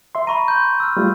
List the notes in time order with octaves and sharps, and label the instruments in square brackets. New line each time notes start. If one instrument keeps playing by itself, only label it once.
[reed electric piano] E5 C6
[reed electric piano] A#5 [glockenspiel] B5 C#6 D#7
[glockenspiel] C6 G6
E6 F6
[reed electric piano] G3 A3 F4